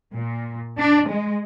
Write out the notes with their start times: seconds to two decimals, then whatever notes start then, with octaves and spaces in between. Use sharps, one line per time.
0.16 A#2
0.78 D4
1.09 G#3